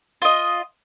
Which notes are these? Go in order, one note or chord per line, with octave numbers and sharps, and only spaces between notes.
F4 D#5